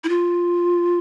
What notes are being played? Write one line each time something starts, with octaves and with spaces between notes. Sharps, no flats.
E4
F4